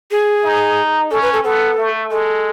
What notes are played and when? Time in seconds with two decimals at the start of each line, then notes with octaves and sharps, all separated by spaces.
0.11 G#4
0.44 D#4
1.11 C#4 A4
1.22 B4
1.33 A4
1.44 B3 A4
1.78 A3
2.11 G#3 A4